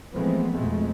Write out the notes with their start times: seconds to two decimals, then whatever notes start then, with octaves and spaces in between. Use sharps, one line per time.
0.14 E3 F3 G#3 A3 B3 C4
0.52 F2 B2 G#3 A3